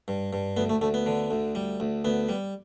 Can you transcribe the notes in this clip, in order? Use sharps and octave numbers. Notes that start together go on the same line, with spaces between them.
G2
G2
D2 B3
A3
D2 A3
B3
D3
D2
G3
D2
D2 B3
G3